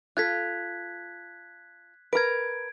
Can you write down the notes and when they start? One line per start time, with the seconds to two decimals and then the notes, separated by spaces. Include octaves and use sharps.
0.17 F4 A4 F#6 G#6 B6
2.13 A#4 B4 G#6 D7